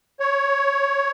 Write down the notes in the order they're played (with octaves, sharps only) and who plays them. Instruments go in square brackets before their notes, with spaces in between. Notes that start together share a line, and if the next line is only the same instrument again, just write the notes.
[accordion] C#5